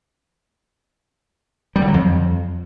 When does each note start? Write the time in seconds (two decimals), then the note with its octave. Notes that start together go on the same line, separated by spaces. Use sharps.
1.76 G3
1.82 D3
1.88 F#3
1.94 F2